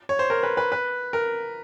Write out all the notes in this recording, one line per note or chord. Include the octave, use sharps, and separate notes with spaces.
C#5
C5
A#4
B4
B4
B4
A#4